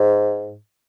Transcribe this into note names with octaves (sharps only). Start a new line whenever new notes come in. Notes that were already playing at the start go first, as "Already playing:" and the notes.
Already playing: G#2